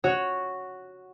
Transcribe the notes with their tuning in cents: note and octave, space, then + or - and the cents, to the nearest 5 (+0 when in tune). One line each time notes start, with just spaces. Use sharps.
F#4 +0 C#5 +0